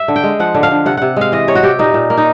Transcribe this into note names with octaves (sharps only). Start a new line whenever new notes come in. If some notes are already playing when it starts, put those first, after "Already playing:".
Already playing: E5
D3
G5
G#3
F3 F#5
D3
F5
D3
C3 F#5
C3 F#5
G#3 F5
E3 D#5
C3 C#5
F#4
C3 G4
A#2 D#4
A#2
A#3
D#4